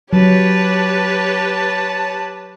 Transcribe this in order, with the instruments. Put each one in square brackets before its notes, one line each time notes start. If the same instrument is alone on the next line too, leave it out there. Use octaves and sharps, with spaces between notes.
[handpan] F#3 [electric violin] G4 B4 [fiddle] C#5 [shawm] A5